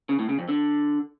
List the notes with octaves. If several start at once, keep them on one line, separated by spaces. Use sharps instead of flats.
C#3
A2
C#3
F2
D3